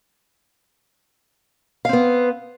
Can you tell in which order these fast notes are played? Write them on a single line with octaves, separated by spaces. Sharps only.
F5 C4 B3